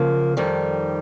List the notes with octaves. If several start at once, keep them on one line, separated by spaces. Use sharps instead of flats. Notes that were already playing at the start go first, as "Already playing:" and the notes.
Already playing: C#3 F3 A#3
F2 D#3 G3